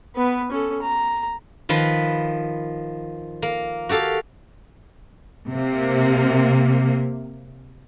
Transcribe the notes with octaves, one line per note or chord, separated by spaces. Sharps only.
B3 B4
C#4 A4
A#5
D#3 F3 B4
A#3
F#4 G4 A4 F5
C3 A#3